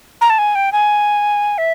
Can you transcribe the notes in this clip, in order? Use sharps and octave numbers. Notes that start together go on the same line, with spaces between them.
A#5
A5
G#5
G5
G#5
E5